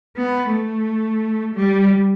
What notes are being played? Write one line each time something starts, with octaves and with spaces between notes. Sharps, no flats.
B3
A3
G3